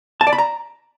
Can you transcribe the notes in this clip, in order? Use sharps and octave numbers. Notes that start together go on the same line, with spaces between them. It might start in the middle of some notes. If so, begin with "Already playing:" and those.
A5
D5
B5
A#5